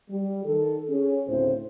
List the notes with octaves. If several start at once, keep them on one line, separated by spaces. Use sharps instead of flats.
G3
D#3 A4
C#4 G#4
D2 A2 C#3 C4 C5